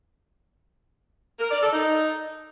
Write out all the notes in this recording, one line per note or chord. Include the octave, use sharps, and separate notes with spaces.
A#4
D5
A4
D#4